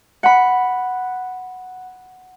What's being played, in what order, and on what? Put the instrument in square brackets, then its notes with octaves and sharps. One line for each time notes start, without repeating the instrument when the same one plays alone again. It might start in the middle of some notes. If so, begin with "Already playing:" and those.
[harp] F#5 B5